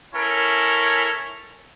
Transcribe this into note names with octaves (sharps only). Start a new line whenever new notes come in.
C#4 E4 A4 A#4 C#5